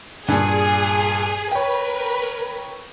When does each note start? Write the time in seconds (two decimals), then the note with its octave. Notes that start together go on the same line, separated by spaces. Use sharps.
0.28 G2 A#2 G#4
1.52 A#4 B4 C#5 G5